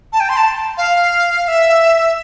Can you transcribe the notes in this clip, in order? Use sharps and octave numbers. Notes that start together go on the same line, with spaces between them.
A5
G5
C6
A5
F5
F5
E5